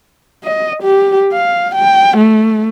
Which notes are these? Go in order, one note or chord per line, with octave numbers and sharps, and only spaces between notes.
D#5
G4
F5
G5
A3